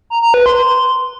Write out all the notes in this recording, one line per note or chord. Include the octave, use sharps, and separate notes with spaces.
A#5
A#5
B4
C6